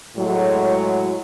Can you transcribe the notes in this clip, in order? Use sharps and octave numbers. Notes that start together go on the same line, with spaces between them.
A2 F#3 G#3